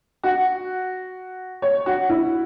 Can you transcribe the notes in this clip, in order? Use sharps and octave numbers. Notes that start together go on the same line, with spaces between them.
F#4
C#5
F#4
E4